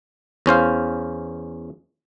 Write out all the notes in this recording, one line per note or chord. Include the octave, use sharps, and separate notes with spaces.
E2 C#4 C5 F5